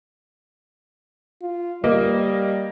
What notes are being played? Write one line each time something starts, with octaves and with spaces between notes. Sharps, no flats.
F4
G3 A#3 D#5